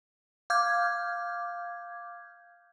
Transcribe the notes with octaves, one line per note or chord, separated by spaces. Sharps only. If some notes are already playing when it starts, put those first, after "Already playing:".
F5 D6 F6 G6 G#6